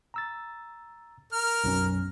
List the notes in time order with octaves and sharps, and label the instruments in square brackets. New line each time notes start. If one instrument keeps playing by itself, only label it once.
[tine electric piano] A#5 E6 A6
[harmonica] A#4 F6
[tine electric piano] B1 F#2 C#4